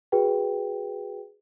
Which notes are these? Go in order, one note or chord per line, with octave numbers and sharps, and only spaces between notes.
F#4 G#4 B4 G5